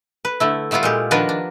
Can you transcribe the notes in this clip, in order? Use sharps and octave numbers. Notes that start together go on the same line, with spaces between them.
B4
D3 A3 E4
G3 A3 B3 E4 F4
A#2 G#3 G4
D#3 F3 B3 D4 A#4 B4
D4